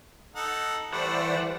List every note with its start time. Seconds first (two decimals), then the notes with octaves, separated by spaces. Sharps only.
0.35 D#4 A4 F#5
0.93 E3 G3 A3 B4 C5 D5 F#5